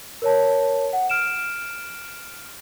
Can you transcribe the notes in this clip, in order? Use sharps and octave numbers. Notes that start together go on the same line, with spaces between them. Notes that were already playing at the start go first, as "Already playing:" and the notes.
A#4 C#5 A5
F#5
F6 D7 E7